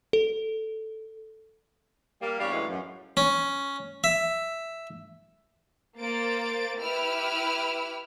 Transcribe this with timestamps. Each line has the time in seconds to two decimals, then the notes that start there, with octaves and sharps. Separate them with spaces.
0.13 A4
2.22 G3 A#3
2.40 E2 G3 D4 C#5 F5
2.52 F#2 A2 E3 G#3 C#5 F5
2.70 F#2
3.17 C#4
4.04 E5
5.99 A#3 C5 A6 D7
6.80 E4 G4 B4 E6 F6 D7